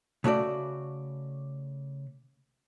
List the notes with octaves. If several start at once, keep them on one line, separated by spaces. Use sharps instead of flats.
C#3 A3 F#4 D5